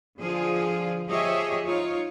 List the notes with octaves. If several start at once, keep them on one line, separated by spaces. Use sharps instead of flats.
D3 F3 F4 G#4
F3 G4 G#4 C#5 D#5 E5
D#4 F4 C#5